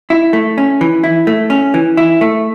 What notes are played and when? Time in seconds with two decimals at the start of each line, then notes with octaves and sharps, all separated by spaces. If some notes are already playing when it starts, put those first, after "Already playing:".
0.10 E4
0.33 A3
0.58 C#4
0.81 E3
1.04 E4
1.27 A3
1.50 C#4
1.74 E3
1.97 E4
2.21 A3